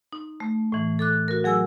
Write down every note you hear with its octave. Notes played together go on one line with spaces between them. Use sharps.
D#4
A3
A2 E3
A4 D6 F#6
F#4 A#4
F#3 G#4 G#5 E6